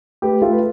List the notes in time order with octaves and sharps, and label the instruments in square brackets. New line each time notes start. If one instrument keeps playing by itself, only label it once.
[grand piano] A3 G4 B4
A3 F4 A4
B4